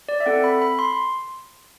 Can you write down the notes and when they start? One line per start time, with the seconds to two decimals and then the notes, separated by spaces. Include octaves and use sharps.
0.09 D5
0.20 E5
0.26 C4 E4 A4 F#5
0.44 B5
0.62 B5
0.79 C6